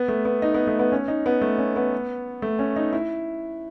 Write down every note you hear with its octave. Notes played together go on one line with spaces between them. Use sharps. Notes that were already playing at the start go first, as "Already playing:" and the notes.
Already playing: B3
A3
B3
D#4
B3
A3
B3
C#4
D#4
B3
A3
C#4
B3
A3
C#4
D#4
E4